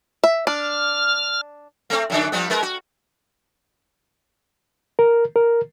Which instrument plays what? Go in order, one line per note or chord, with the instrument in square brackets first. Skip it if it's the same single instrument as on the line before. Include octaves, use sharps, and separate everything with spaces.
[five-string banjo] E5
[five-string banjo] D4 [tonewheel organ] F6
[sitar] A3 C4
F#2 D3 D4
F3 G3 B3
G#3 A#4 B4
F#4
[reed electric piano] A#4
A#4